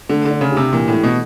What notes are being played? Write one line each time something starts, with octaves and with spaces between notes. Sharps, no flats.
D3 A3
D3
D4
C#3
G4
C3
A#2 E3
A2
A3
B2